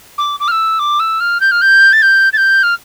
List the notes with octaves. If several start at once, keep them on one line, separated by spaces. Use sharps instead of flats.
D6
D6
F6
E6
D6
E6
F6
G6
F6
G6
A6
G6
A6
G6
F6